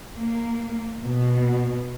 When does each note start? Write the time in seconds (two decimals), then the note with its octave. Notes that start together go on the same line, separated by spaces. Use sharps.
0.16 A#3
1.02 B2